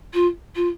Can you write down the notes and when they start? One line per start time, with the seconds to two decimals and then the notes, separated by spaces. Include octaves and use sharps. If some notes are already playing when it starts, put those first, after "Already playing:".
0.14 F4
0.56 F4